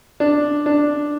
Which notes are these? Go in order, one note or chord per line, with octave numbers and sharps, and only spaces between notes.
D4
D4